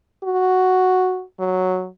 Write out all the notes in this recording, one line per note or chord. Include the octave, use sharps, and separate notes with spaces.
F#4
F#3